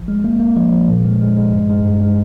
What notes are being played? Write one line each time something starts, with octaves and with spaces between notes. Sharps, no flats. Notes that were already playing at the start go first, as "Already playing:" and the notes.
Already playing: G#1 F3
G#3
A#3
A#3
F3
F3
A#2
G#3
G#3
G#3
G2
G#3
G2
G#3